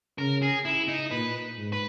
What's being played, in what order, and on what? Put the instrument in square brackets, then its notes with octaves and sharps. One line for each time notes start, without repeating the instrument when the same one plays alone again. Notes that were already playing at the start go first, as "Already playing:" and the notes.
[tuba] C#3 [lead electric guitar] A#4
[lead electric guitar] G#4
E4
D#4
[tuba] A#2 [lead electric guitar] B4
[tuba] G#2
[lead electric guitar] B4